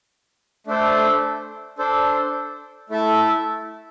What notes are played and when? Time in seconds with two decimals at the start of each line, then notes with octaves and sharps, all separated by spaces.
0.67 A3 D4 A4 C5
1.78 D4 A4 C5
2.90 A3 E4 A4 E5 A5